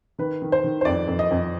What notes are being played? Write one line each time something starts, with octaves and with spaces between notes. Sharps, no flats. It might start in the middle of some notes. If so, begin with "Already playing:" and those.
D#3 B4
D#3
C5
D#3
C5
F2 D5
F2
D#5
F2